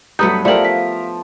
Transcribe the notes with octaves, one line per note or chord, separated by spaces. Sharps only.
G2 F#3 A3 B3 B4 A#5 D#6 G6
F3 A3 E4 G4 A#4 D5 F#7
F5 B6